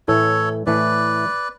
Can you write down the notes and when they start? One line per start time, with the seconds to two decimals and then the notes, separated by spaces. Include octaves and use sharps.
0.08 A2 E3 A3 A4 C#5
0.66 A2 E3 A3 B4 D5